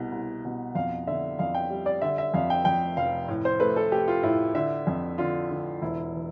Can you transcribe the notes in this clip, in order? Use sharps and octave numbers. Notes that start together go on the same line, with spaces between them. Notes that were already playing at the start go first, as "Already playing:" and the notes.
Already playing: C2 B2
C2
B2
F2 F5
D3 E5
F2 F5
G5
G3
D5
D3 E5
E5
F2 F5
G5
F2 G5
F1 F5
A2
C5
A3 B4
A4
A3 G4
F4
A2 E4
D3 E5
F2
D3 F4
D3
E1 E4
E3